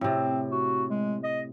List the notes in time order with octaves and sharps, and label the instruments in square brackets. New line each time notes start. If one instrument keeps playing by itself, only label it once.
[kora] A2 C3 [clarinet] C4
[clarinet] F#4
G#3
D#5